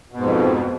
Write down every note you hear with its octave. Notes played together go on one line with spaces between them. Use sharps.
F2 G#2 B2